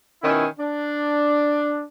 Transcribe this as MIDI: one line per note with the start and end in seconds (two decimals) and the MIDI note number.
0.22 0.45 47
0.22 0.45 51
0.22 0.45 61
0.22 0.45 64
0.58 1.82 62